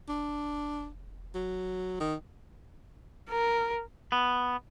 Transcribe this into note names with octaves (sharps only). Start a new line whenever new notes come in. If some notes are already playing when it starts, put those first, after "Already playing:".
F1 D4
F#3
D#3
A#4
B3